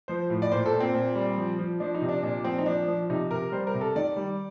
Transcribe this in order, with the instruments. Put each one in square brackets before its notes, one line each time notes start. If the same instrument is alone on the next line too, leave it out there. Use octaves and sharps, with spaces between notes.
[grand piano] F3 C5
A2
D5
A#2 C5
A4
A#2
C4
A#2
G3
F3
F3
F3 D4
D#4
C3
D4
A#2 D4
F3 C4
D#4
F3 D4
F3
C3 D#4
C3 A#4
G3 C5
A#4
C3
A4
D#3 D5
G3